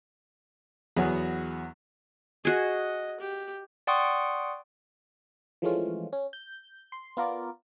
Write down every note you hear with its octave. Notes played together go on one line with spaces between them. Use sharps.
E2 F#3 B3 F#4 G#4
F#4 G#4 D#5
G4
D5 F#5 G5 C6 C#6 D#6
E3 F3 G#3 A3 C#4 F4
C#4
G6
C6
B3 F4 A#4 D5